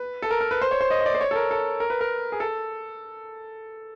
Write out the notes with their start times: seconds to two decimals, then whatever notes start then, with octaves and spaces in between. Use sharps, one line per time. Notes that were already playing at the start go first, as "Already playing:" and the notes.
Already playing: B4
0.22 A4
0.31 A#4
0.41 A#4
0.51 B4
0.62 C5
0.71 C#5
0.81 C5
0.91 D#5
1.01 D#5
1.06 D5
1.15 C5
1.21 C#5
1.31 A4
1.36 A#4
1.51 A4
1.80 A#4
1.90 B4
2.01 A#4
2.32 G#4
2.40 A4